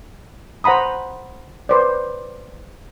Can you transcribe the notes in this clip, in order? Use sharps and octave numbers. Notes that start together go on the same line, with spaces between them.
C5 F#5 A#5 B5 D#6
B4 C5 D5